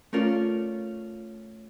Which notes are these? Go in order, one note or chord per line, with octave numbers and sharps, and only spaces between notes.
A3 C#4 F4 A#4 D5